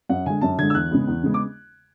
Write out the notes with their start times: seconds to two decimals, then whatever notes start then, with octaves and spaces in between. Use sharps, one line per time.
0.09 F#2 F#5
0.26 D3 G#3 G#5
0.41 F#2 A5
0.58 D3 G#3 G#6
0.70 E6
0.74 E2 F#6
0.91 C#3 G#3 B3
1.07 E2
1.23 C#3 G#3 B3
1.34 D6